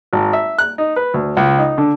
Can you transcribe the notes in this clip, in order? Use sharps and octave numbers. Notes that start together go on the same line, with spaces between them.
G#1
E5
F#6
D#4
B4
D2
C#2
D#4
D3